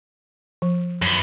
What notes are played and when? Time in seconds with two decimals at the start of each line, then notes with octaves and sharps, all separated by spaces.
0.62 F3
1.02 F#2 B3